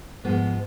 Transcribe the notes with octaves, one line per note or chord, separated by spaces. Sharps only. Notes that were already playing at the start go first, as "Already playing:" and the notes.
G#2 F3 G#3 B3